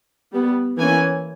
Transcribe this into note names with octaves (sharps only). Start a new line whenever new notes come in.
G3 B3
E3 A#3 C#4 G#5